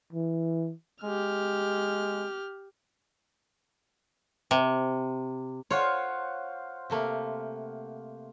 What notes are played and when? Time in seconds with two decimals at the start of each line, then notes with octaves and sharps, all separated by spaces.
0.13 E3
1.04 G#3 G4 F6
4.51 C3
5.71 F4 C5 C#5 F5 F#5
6.90 C3 A3 A#3